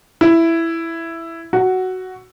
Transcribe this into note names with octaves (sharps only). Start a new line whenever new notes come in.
E4
F#4